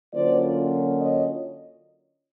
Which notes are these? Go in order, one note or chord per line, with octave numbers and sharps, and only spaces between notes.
D3 F#3 A#3 C#4 F4 C5 D5
C#5 D#5